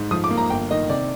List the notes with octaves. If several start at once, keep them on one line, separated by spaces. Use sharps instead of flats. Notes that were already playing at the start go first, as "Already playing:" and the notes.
Already playing: G#2
F3 D#6
D6
A#3
A#5
G1 G5
D#3 D#5
C3 D5